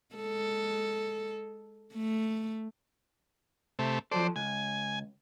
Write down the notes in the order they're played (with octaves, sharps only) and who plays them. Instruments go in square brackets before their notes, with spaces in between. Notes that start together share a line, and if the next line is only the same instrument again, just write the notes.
[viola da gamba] G#3 A4
A3
[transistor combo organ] C3 A3
[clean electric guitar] F3 F#3 A4 [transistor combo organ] C5 D5
[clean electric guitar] C#2 [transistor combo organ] G#5